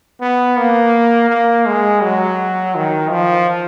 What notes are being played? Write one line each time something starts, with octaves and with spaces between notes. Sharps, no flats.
B3
A#3
A#3
G#3
F#3
D#3
F3